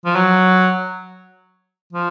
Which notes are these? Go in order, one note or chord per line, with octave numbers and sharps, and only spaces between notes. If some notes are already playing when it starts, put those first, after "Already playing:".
F3
F#3
F3